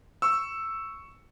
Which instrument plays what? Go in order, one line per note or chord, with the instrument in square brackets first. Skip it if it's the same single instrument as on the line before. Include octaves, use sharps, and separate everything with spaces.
[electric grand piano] C#6 E6